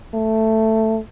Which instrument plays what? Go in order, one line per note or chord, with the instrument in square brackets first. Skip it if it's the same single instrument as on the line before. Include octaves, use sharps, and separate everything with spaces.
[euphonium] A3